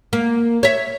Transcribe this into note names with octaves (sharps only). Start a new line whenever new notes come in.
A#3
C#5 E5